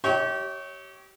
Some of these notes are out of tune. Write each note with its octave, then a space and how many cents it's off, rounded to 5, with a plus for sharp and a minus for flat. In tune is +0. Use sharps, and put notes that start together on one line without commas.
G4 -30 C#5 +0 E5 -45